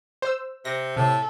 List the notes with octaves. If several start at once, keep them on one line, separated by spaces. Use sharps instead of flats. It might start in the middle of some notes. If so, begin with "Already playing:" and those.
C5 E6
C3 A#6
A2 C3 A4